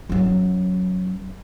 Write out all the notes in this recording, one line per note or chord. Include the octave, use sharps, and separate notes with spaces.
F#2 F#3